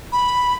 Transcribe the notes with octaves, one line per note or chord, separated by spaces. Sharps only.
B5